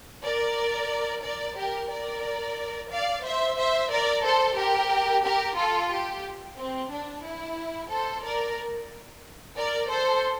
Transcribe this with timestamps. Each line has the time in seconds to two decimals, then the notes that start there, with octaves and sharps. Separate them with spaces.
0.24 A#4 D5
1.23 A#4 D5
1.57 G4 A#4
1.90 A#4 D5
2.91 D5 F5
3.24 C5 E5
3.57 C5 E5
3.91 A#4 D5
4.23 A4 C5
4.57 G4 A#4
5.23 G4 A#4
5.57 F4 A4
5.91 G4
6.57 C4
6.90 D4
7.24 E4
7.90 A4 C5
8.23 A#4 D5
9.57 A#4 D5
9.90 A4 C5